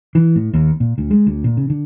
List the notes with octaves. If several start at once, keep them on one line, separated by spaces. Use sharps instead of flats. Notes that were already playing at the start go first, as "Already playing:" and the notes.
E3
A2
D#2
A#2
D2
G#3
D2
A#2
C#3
D3